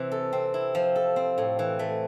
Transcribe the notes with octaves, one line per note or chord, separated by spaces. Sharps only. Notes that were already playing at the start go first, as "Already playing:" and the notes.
Already playing: C3 E3
A4
C4
E4
F3
A4
C4
A2
E3
A3